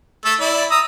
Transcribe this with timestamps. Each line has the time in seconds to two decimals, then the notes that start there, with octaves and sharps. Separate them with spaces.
0.25 A3 A4 E6
0.40 E4 D5
0.71 A#5 D#6 E6